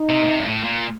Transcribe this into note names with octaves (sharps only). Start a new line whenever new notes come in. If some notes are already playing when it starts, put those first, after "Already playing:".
Already playing: D#4
C3
A#2
C3
G2
A2
A#2